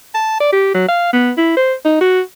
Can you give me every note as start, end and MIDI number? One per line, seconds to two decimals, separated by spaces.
0.14 0.39 81
0.40 0.52 74
0.52 0.73 67
0.74 0.85 54
0.88 1.12 77
1.13 1.31 59
1.37 1.55 64
1.56 1.74 72
1.85 1.98 63
2.01 2.20 66